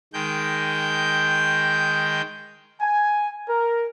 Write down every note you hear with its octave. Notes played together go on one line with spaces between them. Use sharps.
D#3 G#3 G5 G6
G#5
A#4